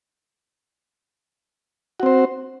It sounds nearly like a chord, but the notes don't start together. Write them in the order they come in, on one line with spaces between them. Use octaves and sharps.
F#4 C4 C5